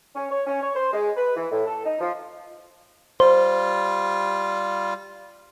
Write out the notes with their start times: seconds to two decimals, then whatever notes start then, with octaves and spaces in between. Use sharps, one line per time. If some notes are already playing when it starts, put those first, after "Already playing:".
0.16 C#4
0.31 C#5
0.47 C#4
0.61 C#5
0.75 C5
0.93 G#3
1.17 B4
1.36 E3
1.52 A2
1.67 A4
1.86 D#4
2.01 F3
3.20 G3 F4 C5